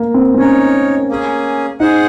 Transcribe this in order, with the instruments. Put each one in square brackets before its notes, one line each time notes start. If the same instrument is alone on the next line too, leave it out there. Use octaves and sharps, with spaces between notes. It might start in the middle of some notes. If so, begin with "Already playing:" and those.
Already playing: [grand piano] A#3
C4
C4
[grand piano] C#4 [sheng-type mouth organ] D#4 A#4 C#5
[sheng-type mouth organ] A#3 C#4 G#4
[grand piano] D#4 [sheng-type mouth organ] G#4 C5 F#5